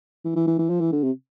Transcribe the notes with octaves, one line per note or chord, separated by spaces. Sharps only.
E3
E3
E3
E3
F3
E3
D3
C3